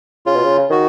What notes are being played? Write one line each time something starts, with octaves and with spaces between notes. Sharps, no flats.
C#3 F4
B2
C#3
D#3 F#4